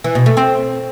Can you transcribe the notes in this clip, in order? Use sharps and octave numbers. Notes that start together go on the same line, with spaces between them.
E3
B2
A3
C4